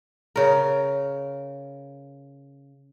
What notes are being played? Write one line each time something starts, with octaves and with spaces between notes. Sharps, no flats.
C#3 A#4